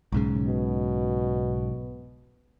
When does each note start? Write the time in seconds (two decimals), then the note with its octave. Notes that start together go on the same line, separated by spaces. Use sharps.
0.12 B1 G#2 C#3
0.47 B2